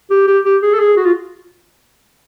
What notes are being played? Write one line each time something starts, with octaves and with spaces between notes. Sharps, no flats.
G4
G4
G4
G#4
A4
G#4
F#4
F4